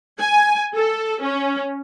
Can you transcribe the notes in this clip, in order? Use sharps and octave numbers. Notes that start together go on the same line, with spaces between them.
G#5
A4
C#4